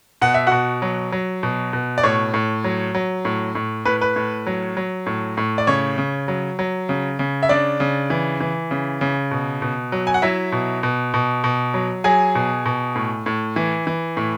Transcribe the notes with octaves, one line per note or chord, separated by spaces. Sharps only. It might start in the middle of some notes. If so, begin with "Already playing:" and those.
B2 F#5
E5
B2 F#4 F#5
F#3
F#3
B2
B2
D5
A2 C#5
A2
F#3
F#3
A2
A2
A2 B4
B4
A2
F#3
F#3
A2
A2
D5
C#3 C#5
C#3
F#3
F#3
C#3
C#3
E5
C#3 D4 D5
C#3
E3
E3
C#3
C#3
B2
B2
F#3
G#5
F#5
F#3 E4 E5
B2
B2
B2
B2
F#3
F#3 G#4 G#5
B2
B2
A2
A2
E3
E3
A2